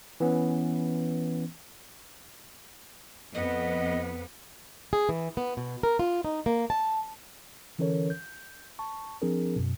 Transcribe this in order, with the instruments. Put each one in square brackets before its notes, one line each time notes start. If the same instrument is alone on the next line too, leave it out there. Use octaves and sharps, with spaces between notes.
[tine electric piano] E3 B3 C#4
[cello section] F2 B3 [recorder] D#5
[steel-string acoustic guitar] G#4
E3
B3
B2
A#4
F4
D#4
A#3
A5
[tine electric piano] D3 E3 C#4 A4 A#4 C#5
G6
A5 C#6
F3 C4 D4 G#4 A#4
F#2 B2